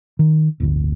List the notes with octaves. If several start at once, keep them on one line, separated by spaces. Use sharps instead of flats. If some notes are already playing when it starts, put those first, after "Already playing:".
D#3
D1 G1 D2